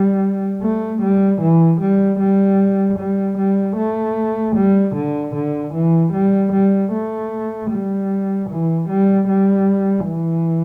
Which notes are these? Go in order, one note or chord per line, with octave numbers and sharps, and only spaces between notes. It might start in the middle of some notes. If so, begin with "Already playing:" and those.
Already playing: G3
A3
G3
E3
G3
G3
G3
G3
A3
G3
D3
D3
E3
G3
G3
A3
G3
E3
G3
G3
E3